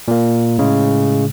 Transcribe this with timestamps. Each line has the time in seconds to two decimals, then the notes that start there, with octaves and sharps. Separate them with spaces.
0.08 A#2 A#3
0.58 A2 C#3 G#3